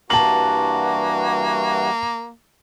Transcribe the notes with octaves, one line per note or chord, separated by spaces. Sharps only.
G2 E3 A#3 F#4 A5 F#7